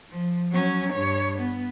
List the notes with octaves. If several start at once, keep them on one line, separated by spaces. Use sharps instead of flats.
F3
F#3 C#4
G2 C#5
B3